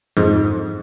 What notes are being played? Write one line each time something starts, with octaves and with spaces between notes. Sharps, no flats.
F2 G#2